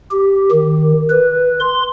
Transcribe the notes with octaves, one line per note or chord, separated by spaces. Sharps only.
G4
D#3
B4
C6